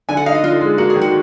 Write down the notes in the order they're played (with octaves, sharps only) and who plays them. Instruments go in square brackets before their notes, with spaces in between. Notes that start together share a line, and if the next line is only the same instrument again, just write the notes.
[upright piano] D3 [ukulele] G#5
[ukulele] F#5
[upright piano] D#4 [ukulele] F5
[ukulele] D#5
[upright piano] D3 [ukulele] F4
[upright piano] G#3
[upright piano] A#3 [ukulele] F#4
[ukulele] G#4
[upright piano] D#3
[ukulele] F#4